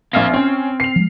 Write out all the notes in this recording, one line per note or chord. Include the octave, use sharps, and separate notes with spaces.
A#1 C4 F5 F6 C7
C4 C#4
C7 F7
F3 G#3